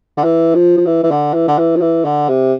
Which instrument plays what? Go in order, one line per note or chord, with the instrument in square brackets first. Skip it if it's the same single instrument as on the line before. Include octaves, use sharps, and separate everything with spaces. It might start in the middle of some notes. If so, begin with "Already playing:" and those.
[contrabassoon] D3
E3
F3
F3
E3
E3
D3
E3
D3
E3
F3
E3
D3
C3